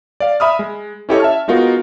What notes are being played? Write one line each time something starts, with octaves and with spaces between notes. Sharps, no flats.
D5 F5
E5 B5 D#6 F6
G#3
C#4 E4 G4 A4 C#5 D#5
E5 A5 F6
G#3 B3 D#4 F4 F#4 A#4